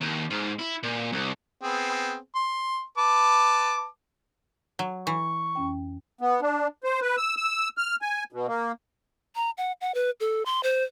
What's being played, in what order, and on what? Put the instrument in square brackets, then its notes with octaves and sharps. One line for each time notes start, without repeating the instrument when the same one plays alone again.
[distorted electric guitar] D#2
G#2
E4
A#2
C2
[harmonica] B3 C4 G#4
C6
B4 A5 D6
[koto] F#3
[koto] E3 [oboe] C#6
[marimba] F2 C#4 G5
[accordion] B3
D4
C5
B4
E6
E6
F6
G#5
B2
A#3
[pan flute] A#5
F#5
F#5
B4
A4
C6
C5